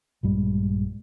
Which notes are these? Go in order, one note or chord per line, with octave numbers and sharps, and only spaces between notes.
A#1 G2 G3 G#3